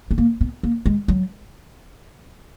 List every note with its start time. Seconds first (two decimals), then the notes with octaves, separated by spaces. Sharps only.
0.11 B3
0.18 A#3
0.41 B3
0.63 A#3
0.86 G#3
1.08 F#3